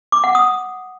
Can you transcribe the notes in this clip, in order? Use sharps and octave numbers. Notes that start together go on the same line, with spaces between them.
D6
F#5
D#6